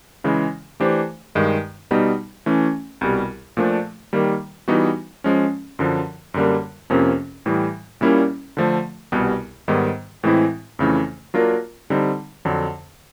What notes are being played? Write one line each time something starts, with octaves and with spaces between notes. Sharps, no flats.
C#3 E3 G#3
E3 A3 D4 G4 C5
G2 D#3 G#3
B2 G3 B3 D#4
E3 A3 C#4
C2 B2 G3
A#2 F3 A3 D4
D#3 G3 A#3
E3 G3 B3 D#4 F#4
F3 G#3 C#4
F#2 D3 F3
F#2 D3 G3 A#3
F2 C3 F3 A#3 C#4
A2 E3 G3
A#2 G3 A#3 C#4 E4
D3 F3 A3
C2 B2 G3 B3
G#2 D#3 G3 B3
A2 E3 G#3 C4 E4
F2 C#3 E3 A3
F#3 A#3 D4 F4 A#4
D3 G3 C4 D#4
F2 D3 F#3